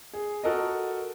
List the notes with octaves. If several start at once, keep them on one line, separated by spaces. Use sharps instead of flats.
G#4
F#4 A4 A#4 D#5